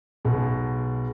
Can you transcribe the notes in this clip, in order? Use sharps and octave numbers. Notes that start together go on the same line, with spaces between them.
B1 B2 G#3